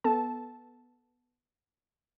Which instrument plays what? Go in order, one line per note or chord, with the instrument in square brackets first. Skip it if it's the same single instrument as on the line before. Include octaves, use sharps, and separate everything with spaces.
[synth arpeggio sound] B3 A4 A5